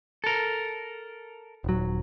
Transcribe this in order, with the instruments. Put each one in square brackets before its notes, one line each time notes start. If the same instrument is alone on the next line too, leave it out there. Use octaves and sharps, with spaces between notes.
[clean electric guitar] A4 A#4
[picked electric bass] D#1 F#3